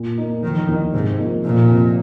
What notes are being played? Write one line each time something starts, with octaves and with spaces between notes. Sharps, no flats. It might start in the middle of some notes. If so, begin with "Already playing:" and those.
Already playing: A#2
A#3 D#4
F1 D#3
D#2 D#3 A#3 D#4
G#2 C3
F3 A#3 D#4
F1 A#2
F2 C3